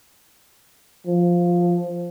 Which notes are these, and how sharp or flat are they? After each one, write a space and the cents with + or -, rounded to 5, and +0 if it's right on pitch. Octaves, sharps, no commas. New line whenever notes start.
F3 +0